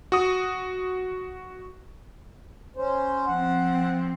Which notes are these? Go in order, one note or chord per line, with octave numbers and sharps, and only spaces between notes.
F#4 D#6
C#4 C5
F3 C4 F#5